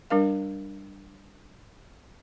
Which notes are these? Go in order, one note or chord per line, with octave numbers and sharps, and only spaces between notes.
G3 D4 A#4 F5